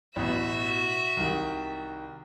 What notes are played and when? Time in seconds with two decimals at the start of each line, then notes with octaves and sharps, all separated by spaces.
0.16 A1 B2 F#4 E5
1.17 C2 D#3